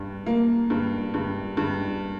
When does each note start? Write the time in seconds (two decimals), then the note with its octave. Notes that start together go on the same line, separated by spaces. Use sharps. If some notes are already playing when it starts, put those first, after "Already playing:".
Already playing: G2
0.26 A#3
0.70 G2
1.14 G2
1.57 G2